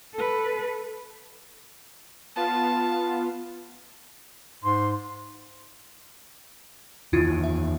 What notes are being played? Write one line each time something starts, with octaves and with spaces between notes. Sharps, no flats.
A4 B4
B3 F4 A5
G#2 C6
E2 D#3 E4 F4
E5